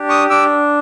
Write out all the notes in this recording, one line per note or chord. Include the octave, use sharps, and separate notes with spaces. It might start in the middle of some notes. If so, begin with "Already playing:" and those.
Already playing: D4 G4
C#6 D#6
D4 D6 E6